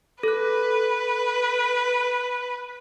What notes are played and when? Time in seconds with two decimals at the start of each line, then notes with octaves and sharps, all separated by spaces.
0.23 A4 B4 F#6